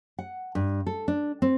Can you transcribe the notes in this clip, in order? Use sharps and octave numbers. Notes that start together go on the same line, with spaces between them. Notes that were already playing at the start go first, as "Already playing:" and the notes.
F#5
G2
A4
D4
C4